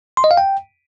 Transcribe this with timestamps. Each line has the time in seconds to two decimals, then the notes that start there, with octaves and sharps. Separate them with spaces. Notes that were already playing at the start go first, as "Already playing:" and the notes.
0.17 C6
0.24 D#5
0.31 F5
0.37 G5